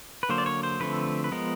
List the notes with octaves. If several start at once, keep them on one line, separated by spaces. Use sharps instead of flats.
B4
D3 F#3 A#3 C5
D5
C#5
C5
D3 F3 A3 C4 B4
B4
F3 G#3 B3 A#4